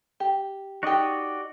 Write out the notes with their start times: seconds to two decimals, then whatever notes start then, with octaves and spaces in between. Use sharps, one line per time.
0.20 G4
0.83 D#4 F#4 G4 D5 D#5